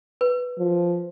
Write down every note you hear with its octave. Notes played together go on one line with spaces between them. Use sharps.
B4
F3